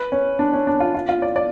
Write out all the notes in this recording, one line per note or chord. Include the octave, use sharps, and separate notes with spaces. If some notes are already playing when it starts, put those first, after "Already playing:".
Already playing: B4
C#4
D4
C#4
D4
F4
F4
F4
D5
D5